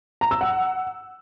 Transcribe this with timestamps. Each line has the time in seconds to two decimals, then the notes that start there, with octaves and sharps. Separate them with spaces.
0.21 A#5
0.31 E6
0.41 F#5